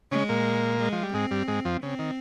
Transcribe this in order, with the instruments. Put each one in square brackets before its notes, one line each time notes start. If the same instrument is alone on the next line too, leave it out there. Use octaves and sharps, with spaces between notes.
[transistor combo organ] C#3 C#4 [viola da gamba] G#3
[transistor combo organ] A#2 A#3
[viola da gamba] G#3
[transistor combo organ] F3
G3
[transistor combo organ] G#2 G#3 [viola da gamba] C4
[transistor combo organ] G2 G3
G#2 G#3
F2 F3
[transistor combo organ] C#3 [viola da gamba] C4
[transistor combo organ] D#3